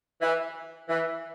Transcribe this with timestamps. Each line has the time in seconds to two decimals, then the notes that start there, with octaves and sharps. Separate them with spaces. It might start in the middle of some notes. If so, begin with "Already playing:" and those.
0.21 E3
0.88 E3